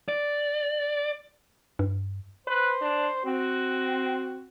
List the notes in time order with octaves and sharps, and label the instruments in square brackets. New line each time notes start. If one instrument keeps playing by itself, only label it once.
[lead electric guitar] D5
[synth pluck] G2
[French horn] B4 [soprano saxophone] C5
[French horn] D4
[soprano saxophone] C4 [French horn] F#4